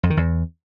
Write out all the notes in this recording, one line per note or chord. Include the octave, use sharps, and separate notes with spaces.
F2
D#3
E2